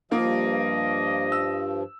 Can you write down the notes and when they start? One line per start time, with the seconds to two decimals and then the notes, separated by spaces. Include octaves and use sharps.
0.11 G2 F3 A#3 F4 D#5
1.32 E6